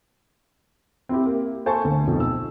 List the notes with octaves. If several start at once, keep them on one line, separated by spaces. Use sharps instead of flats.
C4 E4 G4
A#3
A4 C5 G#5 A5 C#6
D2
B1 F2
E6